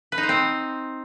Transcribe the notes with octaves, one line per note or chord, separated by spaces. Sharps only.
B4
D#4
C5
C4